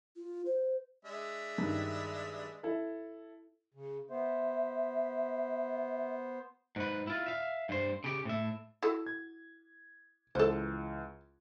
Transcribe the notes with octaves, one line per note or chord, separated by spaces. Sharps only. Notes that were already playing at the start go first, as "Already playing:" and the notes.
F4
C5
G#3 D4 E5
G2 D#3
E4 A4
C#3
B3 C5 E5
G#2 B4
E4 F4
E5 F5
G2 C5
C#3 G4
A2 E5
E4 F#4 A4
G#6
C#2 E3 A4 C5